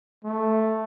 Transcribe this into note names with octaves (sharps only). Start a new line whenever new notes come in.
A3